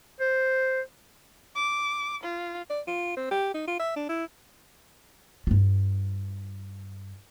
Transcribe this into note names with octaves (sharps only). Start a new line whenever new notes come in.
C5
D6
F4
D5
F4
C4
G4
D#4
F4
E5
D4
E4
G2 F4